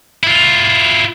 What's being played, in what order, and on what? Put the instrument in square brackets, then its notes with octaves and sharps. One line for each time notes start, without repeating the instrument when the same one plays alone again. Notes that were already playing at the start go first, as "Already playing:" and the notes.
[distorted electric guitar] E4 F4